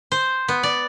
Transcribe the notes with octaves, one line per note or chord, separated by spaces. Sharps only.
C5
B3
D5